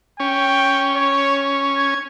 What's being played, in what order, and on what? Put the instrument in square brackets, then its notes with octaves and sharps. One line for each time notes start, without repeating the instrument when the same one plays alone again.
[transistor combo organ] C#4 [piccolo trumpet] G5
[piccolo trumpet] C#5
G#6